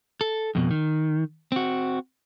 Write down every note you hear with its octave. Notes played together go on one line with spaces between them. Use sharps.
A4
F2 B2
D#3
C4 F#4